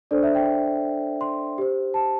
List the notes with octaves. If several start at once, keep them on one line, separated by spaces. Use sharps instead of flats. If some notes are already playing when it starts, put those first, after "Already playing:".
D4 A4 C5 D5
E5
G5
C6
G4 C5
A5